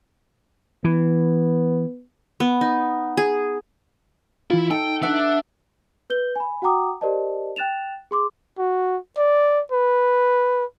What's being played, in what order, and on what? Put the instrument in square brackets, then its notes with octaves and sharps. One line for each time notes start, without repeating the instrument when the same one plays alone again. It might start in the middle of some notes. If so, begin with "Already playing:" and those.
[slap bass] E3 [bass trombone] B3
[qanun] B3
D#4
G#4
[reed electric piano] E3 F4 [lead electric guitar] E4
[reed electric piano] D#4 [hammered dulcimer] A4 [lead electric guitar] G5
[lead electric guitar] D4 [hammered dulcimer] E5 F#5
[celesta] B4 G6 G7
G#5 B5
F#4 F#5 G5 A#5 D6 D#6
G4 A#4 C5 D5 D#5 A5
G5 F#6 A6 E7 F7
G#4 C6 D6
[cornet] F#4
D5
B4